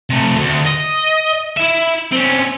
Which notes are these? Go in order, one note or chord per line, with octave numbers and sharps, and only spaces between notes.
C3 A3
D2
D#5
E4 E5
C4 C#4